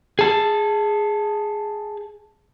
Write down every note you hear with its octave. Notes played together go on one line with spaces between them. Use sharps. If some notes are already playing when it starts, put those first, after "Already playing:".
G#4 A5